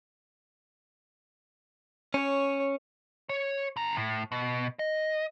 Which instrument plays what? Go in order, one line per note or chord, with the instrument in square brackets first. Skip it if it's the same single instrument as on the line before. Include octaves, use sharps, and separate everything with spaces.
[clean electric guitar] C#4 [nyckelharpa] C#5
[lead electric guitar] C#5
D3 A#5
A2
B2
D#5